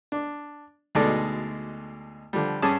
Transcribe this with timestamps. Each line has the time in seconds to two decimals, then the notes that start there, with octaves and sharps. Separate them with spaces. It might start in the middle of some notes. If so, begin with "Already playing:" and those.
0.12 D4
0.95 D2 B2 G#3 D#4 A4 D5
2.33 D3 F3 G3
2.62 G2 C#4 G#4 A5 D6 D#6